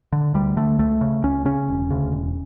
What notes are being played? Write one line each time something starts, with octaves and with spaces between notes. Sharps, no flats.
D3
D2 G3
D3 A3
C#2 A3
C#3
C#2 C#4
C#3 C#4
E1
D2 C#3
E1